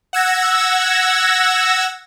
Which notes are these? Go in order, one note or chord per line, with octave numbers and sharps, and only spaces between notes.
F#5 E6 G#6 A#6